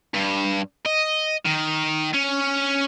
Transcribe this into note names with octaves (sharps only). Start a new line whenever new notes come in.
G2
D#5
D#3
C#4